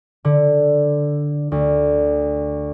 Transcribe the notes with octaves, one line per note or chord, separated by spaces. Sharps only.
D3
D2